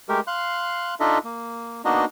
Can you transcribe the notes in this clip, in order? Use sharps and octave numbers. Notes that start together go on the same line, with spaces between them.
G#3 A3 G4 A#4
F5 C6 F#6
D4 D#4 F4 A4 D#5 E5
A#3
A#3 B3 D4 D#4 F#4 D#5